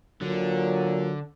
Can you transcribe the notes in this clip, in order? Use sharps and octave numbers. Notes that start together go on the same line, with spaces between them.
A#2 D3 F#3